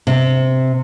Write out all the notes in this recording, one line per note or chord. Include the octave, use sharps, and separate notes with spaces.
C3